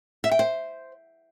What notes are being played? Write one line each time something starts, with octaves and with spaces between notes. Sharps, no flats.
E5
G5
C5